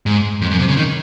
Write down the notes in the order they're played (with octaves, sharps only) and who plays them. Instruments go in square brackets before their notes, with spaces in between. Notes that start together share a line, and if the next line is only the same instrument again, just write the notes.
[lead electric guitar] G#2
F2
F#2
C3
C#3
D#3